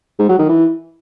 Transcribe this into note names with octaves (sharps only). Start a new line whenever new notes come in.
G#2
F#3
D#3
E3